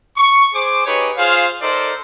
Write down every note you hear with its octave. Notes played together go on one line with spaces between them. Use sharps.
C#6
G#4 C5 D6
D#4 G4 G#4 B4 C#5 C#6
F4 G#4 C5 F5
D#4 A4 A#4 C5 D5 D#5